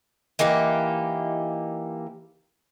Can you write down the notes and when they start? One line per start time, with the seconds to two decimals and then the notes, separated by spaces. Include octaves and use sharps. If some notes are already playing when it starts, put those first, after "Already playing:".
0.39 E3 A#3 D#4 G4